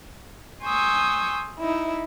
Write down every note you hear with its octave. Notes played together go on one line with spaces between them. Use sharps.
G#5 C6 C#6 D#6 E6 G6
D#4 E4